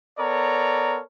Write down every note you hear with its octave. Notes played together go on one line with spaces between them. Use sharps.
B3 A4 A#4 C#5 D5 A#5